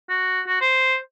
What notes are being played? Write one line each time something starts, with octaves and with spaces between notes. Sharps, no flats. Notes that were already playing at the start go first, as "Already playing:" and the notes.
F#4
F#4
C5